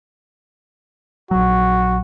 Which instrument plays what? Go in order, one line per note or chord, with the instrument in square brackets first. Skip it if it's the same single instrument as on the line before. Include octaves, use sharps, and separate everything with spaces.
[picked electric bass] A#1 F#3 [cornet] F#4